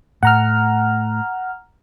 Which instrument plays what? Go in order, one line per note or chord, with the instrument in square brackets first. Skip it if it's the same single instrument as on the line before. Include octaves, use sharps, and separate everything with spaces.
[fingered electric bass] A2 [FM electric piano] F#5 A#5 F6